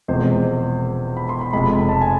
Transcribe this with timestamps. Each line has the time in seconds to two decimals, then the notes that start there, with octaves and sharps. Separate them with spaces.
0.08 E1 E2 C3 F3 G#3 C5
1.17 B5
1.29 C6
1.41 B5
1.53 F1 F2 C3 G#3 B5
1.89 A5
2.01 G#5